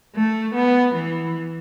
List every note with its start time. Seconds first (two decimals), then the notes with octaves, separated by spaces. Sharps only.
0.16 A3
0.55 B3
0.95 E3